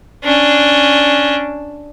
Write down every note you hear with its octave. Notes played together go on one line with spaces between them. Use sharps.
C#4 D4